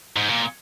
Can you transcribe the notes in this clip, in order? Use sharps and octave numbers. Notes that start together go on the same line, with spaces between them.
G#2
A#2